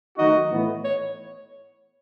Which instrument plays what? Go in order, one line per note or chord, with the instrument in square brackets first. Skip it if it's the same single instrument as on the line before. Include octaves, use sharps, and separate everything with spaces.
[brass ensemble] D#3 F#3 A3 D#4 F#4 [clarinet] D#5
[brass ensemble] A2 E3 B3
[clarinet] C#5